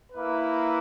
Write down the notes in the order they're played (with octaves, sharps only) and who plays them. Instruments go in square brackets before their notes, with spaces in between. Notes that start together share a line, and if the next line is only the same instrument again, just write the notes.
[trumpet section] A#3 E4 B4